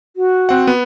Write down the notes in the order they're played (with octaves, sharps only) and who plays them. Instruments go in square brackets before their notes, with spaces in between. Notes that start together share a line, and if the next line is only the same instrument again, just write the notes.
[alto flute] F#4
[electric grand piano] C4 F#5
B3